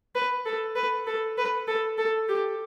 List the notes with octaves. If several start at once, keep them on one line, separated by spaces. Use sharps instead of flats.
B4
A4
B4
A4
B4
A4
A4
G4